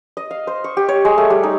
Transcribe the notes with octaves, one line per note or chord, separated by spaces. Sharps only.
D#5
F5
C5
C#6
G4
C#5
G#3
A3
G3
D#4